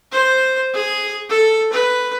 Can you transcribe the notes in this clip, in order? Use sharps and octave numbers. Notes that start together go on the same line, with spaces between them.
C5
G#4
A4
B4